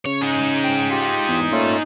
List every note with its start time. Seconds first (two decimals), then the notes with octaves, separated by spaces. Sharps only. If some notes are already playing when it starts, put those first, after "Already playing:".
0.06 C#3 C#5
0.22 D#4 G#4
0.64 G5
0.90 F4 G4
1.28 E2
1.51 A#2 A3 C#4 F4